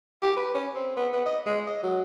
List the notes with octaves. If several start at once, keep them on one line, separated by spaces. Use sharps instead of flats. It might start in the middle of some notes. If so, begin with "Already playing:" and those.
G4
B4
C#4
C4
B3
B3
D#5
G#3
D#5
F#3